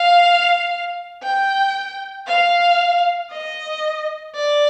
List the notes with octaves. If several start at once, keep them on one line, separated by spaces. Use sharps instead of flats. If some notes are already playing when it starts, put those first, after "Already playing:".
Already playing: F5
G5
F5
D#5
D5